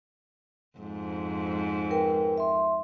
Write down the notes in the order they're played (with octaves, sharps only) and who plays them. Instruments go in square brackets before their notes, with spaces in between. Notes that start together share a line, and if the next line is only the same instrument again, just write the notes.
[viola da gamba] F2 G#2
[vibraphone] A#4 B4 G5
E5 C6